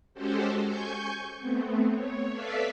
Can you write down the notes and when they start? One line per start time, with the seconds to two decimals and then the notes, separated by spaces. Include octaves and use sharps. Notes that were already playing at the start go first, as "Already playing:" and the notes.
0.14 G#3 C#4 F#4 G4 A4 C5
0.65 G#5 C#6 G6
1.40 A3 B3 C4
1.89 C#5
2.32 A4 B4 D5 E5 F5 B5